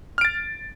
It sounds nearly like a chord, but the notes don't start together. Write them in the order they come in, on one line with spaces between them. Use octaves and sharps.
F6 D7 A6